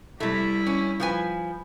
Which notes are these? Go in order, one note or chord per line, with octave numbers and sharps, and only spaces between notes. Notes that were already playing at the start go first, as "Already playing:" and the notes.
C3 G3 A3 E4
C#4
F3 B4 G#5